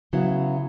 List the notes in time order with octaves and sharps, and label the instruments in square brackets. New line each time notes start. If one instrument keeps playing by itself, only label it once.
[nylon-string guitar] C#3 F#3 B3 E4